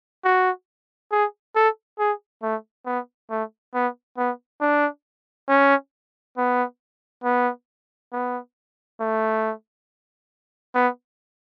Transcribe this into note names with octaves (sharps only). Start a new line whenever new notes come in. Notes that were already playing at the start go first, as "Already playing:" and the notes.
F#4
G#4
A4
G#4
A3
B3
A3
B3
B3
D4
C#4
B3
B3
B3
A3
B3